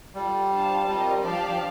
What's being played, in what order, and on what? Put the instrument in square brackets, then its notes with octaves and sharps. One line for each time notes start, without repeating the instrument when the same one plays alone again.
[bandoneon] G3 [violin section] F4 A4 D5
[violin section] D4 F4 C5 F5 A5
[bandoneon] G3 [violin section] C4 F4 A#4 D#5
[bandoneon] G3
[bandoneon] F3 [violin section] D4 G4 D5 F5 A5
[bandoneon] F3